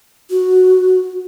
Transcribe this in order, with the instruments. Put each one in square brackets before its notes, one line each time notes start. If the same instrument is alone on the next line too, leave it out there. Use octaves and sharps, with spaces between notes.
[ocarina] F#4